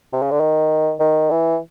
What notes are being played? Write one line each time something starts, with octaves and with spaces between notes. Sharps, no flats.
C3
C#3
D3
D#3
D#3
E3